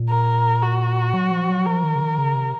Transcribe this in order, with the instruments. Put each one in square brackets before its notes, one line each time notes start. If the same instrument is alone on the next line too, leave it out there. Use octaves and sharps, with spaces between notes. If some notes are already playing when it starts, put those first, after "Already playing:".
Already playing: [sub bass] A#2
[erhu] A#4
F#4
[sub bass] F#3
F3
F#3
[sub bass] F3 [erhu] A#4
[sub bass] D#3
C#3
D#3
C#3
C3